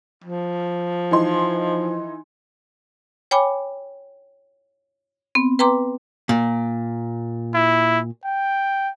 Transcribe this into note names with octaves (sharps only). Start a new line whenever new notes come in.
F3
E3 D#4 C6
C#5 G5 G#5 B5 D6
B3 C4
B4 G5 A#5 C6 D6
A#2
E4
G5